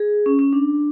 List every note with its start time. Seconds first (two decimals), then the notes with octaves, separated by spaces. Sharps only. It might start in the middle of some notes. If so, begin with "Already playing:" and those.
Already playing: G#4
0.26 C#4
0.39 C#4
0.53 D4